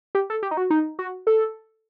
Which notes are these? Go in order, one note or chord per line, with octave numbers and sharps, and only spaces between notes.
G4
A4
G4
D#4
F#4
D#4
F#4
A4